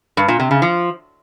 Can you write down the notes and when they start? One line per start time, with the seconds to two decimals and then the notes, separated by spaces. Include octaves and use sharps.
0.17 G2
0.28 A#2
0.40 C3
0.51 C#3
0.62 F3